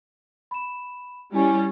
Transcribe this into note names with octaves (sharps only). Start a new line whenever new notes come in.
B5 E7
G3 C#4 E4 G#5